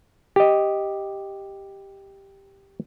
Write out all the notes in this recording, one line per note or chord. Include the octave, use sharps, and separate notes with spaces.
G4 D#5